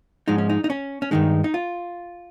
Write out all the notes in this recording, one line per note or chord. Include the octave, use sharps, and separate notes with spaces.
G#2 F3 G#3 D#4
C#4
D#4
D#4
C#4
C#4
G2 D#3 G#3 D#4
D#4
F4